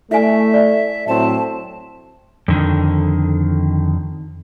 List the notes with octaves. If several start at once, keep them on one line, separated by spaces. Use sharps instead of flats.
A3 E4 D5 E5 G#5
D5
A2 F#3 C4 A5
F2 D3 D#3